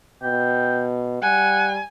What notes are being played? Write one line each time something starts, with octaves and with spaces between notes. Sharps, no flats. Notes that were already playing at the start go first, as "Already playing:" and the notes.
B2 G5
G3 F#5 G#5